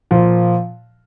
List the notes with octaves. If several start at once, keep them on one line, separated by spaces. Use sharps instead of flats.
A#2 F3